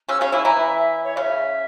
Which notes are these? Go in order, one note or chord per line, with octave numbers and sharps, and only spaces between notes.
C#3 C#4 E6
C#3 C#4 F5
E3 E4 G#5
E3 E4 A#5
E5
E5
C#5
C#3 C#4 E5 F5